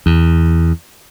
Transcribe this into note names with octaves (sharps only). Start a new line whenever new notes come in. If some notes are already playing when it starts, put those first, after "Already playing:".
E2